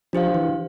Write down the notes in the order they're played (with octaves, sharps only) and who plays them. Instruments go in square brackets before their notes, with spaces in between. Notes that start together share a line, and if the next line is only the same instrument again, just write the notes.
[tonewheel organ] F3 [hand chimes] D4 G4 C5 F5
[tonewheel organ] E3